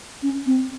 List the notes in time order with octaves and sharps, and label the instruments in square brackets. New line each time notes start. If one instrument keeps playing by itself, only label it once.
[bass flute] C#4
C4